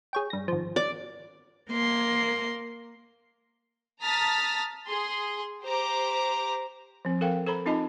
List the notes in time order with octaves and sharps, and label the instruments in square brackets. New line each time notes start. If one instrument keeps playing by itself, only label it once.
[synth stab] G#4 C#5 G5
G2 A#6
G#1 F3
[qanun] D5
[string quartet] A#3 C6
[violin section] A5 A#5 D#6 F6 A6 B6
G#4 C6
G4 C5 A#5 D6
[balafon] F3 C4
A4 A#4 C5 F5 G5
A4 C5 A#5 B5
C4 D#4 F4 D#5 A5 B5